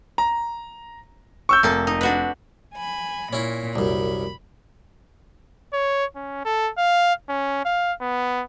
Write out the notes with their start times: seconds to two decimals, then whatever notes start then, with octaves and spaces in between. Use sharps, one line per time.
0.18 A#5
1.49 C#6 E6 G6
1.63 F1 A#3 A4 E5
1.87 D#4
2.01 D4 F#4 B4
2.74 G#5 B5
3.33 A#2 C#4 E4
3.76 C2 F#2 B5
5.73 C#5
6.16 C#4
6.45 A4
6.78 F5
7.29 C#4
7.65 F5
8.01 B3